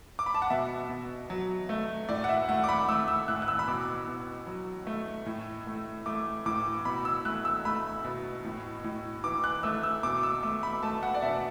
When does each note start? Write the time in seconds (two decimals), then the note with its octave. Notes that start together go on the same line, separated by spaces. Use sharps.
0.19 D6
0.26 B5
0.35 A5
0.42 F#5
0.50 B2 E5
0.89 B2
1.30 F#3
1.69 A3
2.09 A2 D5
2.24 F#5
2.29 E5
2.49 A3 F#5
2.64 D6
2.69 B5
2.88 A3 E6
3.08 E6
3.28 A2 F#6
3.42 F#6
3.48 E6
3.59 B5
3.68 B2 D6
4.08 B2
4.47 F#3
4.87 A3
5.26 A2
5.67 A3
6.06 A3 D6
6.46 A2 D6
6.85 B2 B5
7.05 E6
7.25 A3 F#6
7.45 E6
7.65 A3 B5
8.05 B2
8.44 A2
8.84 A2
9.24 E3 D6
9.44 F#6
9.63 A3 E6
9.83 E6
10.03 B2 D6
10.23 E6
10.43 A3 D6
10.63 B5
10.83 A3 A5
11.03 F#5
11.14 D5
11.22 B2 E5